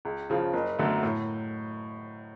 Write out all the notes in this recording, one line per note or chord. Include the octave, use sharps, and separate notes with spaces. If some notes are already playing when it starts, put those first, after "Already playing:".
C#2
C#3 F3
F#1
F#2 D3 F#3 A3
A2